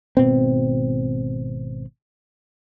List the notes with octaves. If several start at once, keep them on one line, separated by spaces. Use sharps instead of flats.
G#1 B2 C4